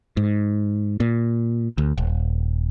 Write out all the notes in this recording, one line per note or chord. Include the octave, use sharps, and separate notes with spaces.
G#2
A#2
D2
D#1